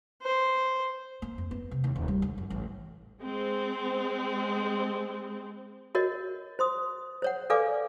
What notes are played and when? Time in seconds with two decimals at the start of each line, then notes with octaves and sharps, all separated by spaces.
0.22 C5
1.22 A#3
1.38 F2
1.51 B3
1.71 C3
1.84 D#2
1.96 D#1
2.08 G3
2.22 D3
2.38 F#2
2.50 A1
3.22 G#3 C4
5.95 F#4 A#4 C#5 D#5
6.59 C5 C6 D#6
7.22 C5 C#5 F#5
7.50 A4 B4 D5 F5 G#5 D6